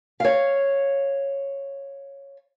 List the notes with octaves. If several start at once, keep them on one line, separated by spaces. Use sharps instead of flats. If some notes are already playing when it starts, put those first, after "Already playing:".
C#5 F5